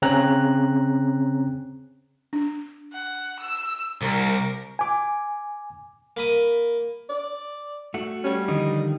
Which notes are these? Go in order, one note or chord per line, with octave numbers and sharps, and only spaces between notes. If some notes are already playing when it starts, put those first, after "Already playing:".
C#3 C4 C#4 A#5 F#6
D4
F#5
E6
C2 A#4
G#5 D6
A#3 B5 D#6
D5
A3 F#4
G3 C#4
D3 D#3 F3 D#5